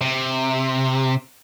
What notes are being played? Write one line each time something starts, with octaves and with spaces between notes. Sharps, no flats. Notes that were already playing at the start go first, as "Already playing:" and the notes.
C3